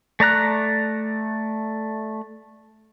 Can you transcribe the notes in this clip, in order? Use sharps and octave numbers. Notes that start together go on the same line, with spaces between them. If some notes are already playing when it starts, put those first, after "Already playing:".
A3 D5 A#5 F#6